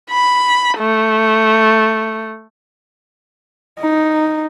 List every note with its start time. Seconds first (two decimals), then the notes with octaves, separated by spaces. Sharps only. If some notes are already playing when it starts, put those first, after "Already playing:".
0.10 B5
0.78 A3
3.79 D#4